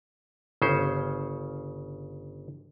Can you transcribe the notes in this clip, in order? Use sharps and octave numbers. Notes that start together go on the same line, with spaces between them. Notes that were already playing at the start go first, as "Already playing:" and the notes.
G1 C#3 C#4 C5